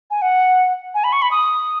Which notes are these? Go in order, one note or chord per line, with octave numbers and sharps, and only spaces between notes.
G#5
F#5
G#5
B5
C#6
B5
D#6